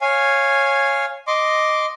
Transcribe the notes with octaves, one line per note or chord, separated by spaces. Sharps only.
C#5 F5 G#5
D#5 C6 D6